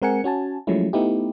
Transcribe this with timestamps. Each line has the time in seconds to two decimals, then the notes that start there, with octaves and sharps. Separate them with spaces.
0.02 G#3 C4 A#4 F#5 G#5 C#7
0.24 C#4 F#4 G#5 A5
0.67 F3 F#3 G#3 A3 C#4 E4
0.93 A3 B3 D#4 E4 G4